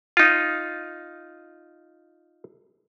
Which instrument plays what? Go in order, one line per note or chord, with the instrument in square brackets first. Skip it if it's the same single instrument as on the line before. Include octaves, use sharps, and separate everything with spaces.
[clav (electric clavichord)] D#4 F4